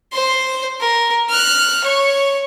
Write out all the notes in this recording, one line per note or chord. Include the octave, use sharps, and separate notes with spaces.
C5 C6
A#4
F6 F#6
C#5 C#6